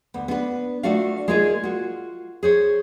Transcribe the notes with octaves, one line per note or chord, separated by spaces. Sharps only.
D2 B3
B3 D4 B4
A3 D4 F4 F#4 D5 F5
G#3 A#3 D#4 F4 F#4 G#4
F4 F#4
G#4 C5 C#5